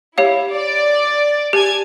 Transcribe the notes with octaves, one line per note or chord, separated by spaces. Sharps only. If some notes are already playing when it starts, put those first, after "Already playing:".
E4 G4 C#5 F5
D5
G4 G#5 A5 G#6